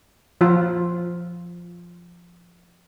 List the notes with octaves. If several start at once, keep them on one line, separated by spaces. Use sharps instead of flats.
F3 F4